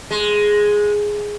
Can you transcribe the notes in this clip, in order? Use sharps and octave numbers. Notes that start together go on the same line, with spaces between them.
G#3